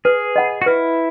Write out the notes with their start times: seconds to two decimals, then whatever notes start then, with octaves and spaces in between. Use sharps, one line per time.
0.05 G#4 B4
0.36 D#5 F#5 B5
0.62 F#4
0.66 E4 B4